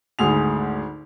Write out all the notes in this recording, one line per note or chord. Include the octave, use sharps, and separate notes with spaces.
G#1 D2 G#4 F7